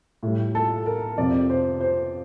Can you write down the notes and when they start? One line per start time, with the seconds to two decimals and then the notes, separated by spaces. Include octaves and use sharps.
0.23 A2 G3
0.55 A4
0.86 A#4
1.18 F2 C3 F3 D5
1.50 C5
1.80 C5